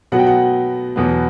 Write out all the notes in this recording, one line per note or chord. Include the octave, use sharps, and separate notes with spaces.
B2 F#3 B3 F#5
G5
F#5
E2 B2 F#3 B3